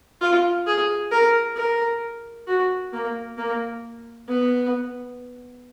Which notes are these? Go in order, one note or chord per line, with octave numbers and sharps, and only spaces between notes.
F4
G#4
A#4
A#4
F#4
A#3
A#3
B3